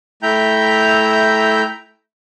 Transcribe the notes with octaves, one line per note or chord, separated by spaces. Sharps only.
A3 E4 E5 G5 A#5 G6